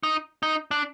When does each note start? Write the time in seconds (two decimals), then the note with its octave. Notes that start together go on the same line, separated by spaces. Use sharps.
0.03 D#4
0.43 D#4
0.71 D4